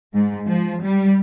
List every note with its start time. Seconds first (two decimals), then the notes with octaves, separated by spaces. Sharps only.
0.14 G#2
0.47 F3
0.84 G3